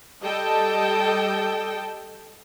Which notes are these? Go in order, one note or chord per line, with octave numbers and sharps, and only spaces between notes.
G3 A4 D#5 G5 A5